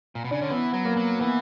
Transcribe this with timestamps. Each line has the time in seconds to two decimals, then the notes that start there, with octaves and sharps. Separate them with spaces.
0.15 A#2
0.24 B2
0.31 C#3 D4
0.41 D3 C#4
0.50 E3 B3
0.73 F#3
0.85 A#3
0.97 F#3
1.20 E3 B3